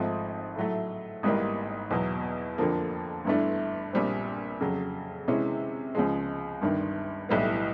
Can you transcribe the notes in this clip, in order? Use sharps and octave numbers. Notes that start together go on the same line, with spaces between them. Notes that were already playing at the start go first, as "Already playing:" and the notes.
Already playing: G#1 G#2 F3 A3 C4
A2 F#3 A3
G#1 G#2 E3 G3 A#3
E2 B2 F#3
F2 D3 F3 A#3
G1 G2 E3 A3 D4
A#1 A#2 G3 C4
F2 C#3 F#3
C3 E3 G#3 C#4
C#2 C#3 F3 G#3
G1 G2 D#3
B1 A2 E3 G3 B3